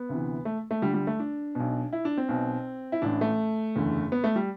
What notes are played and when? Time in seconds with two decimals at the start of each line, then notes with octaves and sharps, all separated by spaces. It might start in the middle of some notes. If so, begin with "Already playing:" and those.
Already playing: B3
0.09 D2 C3 E3
0.45 A3
0.71 A3
0.82 D2 D3 G3
0.94 G3
1.07 A3
1.20 D4
1.55 B1 B2
1.93 E4
2.05 D4
2.17 C4
2.28 B1 B2
2.92 E4
3.02 A1 A2 E3 D4
3.21 A3
3.76 F#1 E2 D3
4.12 B3
4.24 A3
4.36 G3